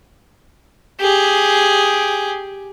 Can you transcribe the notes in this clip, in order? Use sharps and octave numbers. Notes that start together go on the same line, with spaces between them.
G4 G#4